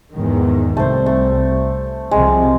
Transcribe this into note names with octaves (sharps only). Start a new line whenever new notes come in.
E2 G#2 D#3
C2 A3 C5
A3
C2 C3 F3 G#3